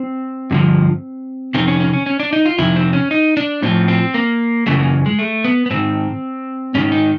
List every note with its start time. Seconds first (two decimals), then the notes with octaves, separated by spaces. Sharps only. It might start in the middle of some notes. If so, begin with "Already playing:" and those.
Already playing: C4
0.51 G2 D3 F3
1.55 F2 C3 D#3 C4
1.68 C#4
1.80 C#4
1.93 C#4
2.06 C#4
2.20 D4
2.33 D#4
2.46 F4
2.59 F2 C3 D#3 E4
2.76 C4
2.93 C#4
3.11 D#4
3.37 D4
3.62 A2 F3 C4
3.88 C4
4.14 A#3
4.67 F#2 C#3 E3 A3
4.79 A#3
5.06 G#3
5.19 A3
5.45 B3
5.66 B3
5.70 G#2 D#3 C4
6.75 G#2 D#3 C#4
6.92 D#4